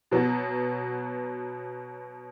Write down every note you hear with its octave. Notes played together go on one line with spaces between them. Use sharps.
B2 F#3 B3 F#4